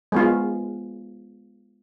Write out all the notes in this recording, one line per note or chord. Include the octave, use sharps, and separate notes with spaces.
G#3 B3 F4